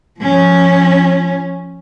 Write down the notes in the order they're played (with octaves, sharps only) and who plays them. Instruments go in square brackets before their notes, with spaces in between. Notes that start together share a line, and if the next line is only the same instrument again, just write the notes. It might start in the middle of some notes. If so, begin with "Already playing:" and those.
[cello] F3 C#4